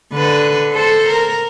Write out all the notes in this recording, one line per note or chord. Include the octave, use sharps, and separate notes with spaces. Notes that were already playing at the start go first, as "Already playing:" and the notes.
D3 B4
A4 C5
A#4